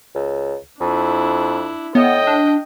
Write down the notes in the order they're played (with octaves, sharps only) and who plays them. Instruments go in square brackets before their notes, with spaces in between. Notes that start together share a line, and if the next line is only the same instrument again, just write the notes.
[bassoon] C#2
[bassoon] F2 [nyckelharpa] D4 E4
[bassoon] A2 [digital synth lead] B3 [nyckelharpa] D#5 G5
[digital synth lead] D4